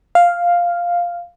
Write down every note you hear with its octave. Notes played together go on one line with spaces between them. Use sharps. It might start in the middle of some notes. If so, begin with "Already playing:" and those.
F5